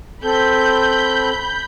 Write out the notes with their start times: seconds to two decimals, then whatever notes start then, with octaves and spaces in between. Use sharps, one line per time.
0.24 C4 A4 B5 G6